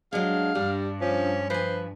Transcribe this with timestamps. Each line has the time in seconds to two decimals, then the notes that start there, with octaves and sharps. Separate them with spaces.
0.13 F#3 G#3 D4 F5
0.55 G2 G3 D4
1.01 F3 C#4
1.50 F3 B4 C5 G#5